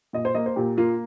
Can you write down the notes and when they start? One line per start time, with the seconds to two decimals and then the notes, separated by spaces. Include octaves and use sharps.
0.13 A#2 D#5
0.25 C5
0.35 A#3 D#5
0.46 C5
0.56 A#2 G4
0.77 A#3 F4